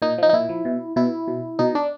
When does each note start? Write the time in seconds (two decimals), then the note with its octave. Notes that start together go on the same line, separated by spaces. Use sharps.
0.02 A#2 D#4
0.18 F3 D#4
0.29 D#4
0.33 A#2 E4
0.49 F3
0.65 B2
0.96 B2 E4
1.28 B2
1.59 B2 D#4
1.75 D4